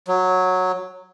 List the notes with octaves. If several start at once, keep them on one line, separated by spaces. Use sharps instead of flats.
F#3